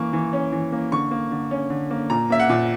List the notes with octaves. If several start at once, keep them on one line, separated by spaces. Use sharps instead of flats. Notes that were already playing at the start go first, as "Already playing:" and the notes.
Already playing: E3 A#3 C#6
E3
C#4
E3
A#3
D3 C#6
A#3
D3
C#4
D3
A#3
A#2 A#5
A#3 E5
F#5
A#2